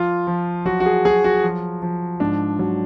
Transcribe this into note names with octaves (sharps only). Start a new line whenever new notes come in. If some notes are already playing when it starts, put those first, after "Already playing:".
Already playing: F3 F4
F3
F#3 F#4
F#4
G#4
F#3 G#4
F#4
F3
F3
G#2 D4
F#3